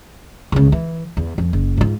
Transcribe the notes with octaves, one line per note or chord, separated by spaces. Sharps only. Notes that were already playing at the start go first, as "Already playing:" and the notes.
C#2 C#3
E3
E2
F2
F#1
G#2 F4